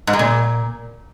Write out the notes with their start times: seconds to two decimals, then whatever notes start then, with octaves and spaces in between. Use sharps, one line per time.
0.07 G#2
0.13 G#3
0.19 A#2